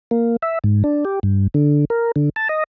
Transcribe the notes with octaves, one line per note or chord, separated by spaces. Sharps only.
A#3
E5
G#2
D4
G4
G2
D3
A#4
D3
A5
D#5